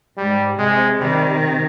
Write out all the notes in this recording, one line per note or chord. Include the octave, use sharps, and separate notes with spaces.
G#2 G3
C3 G#3
C3 D#3 G3